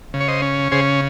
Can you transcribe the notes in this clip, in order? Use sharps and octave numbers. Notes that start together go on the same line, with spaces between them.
C#3
C#5
C5 D#5
C#4
C#3 G#4 C5